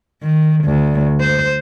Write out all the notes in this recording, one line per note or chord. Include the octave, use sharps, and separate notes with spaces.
D#3
D2
C5